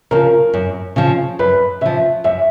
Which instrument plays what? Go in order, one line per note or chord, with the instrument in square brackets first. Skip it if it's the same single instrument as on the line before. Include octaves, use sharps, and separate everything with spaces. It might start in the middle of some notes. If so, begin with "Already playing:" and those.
[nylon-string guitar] C#3 F3 [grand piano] A#4
[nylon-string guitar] F#2
C#3 F3
[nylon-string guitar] F#2 [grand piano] B4
[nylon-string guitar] C#3 F3 [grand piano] E5
[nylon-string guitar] F#2 [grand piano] E5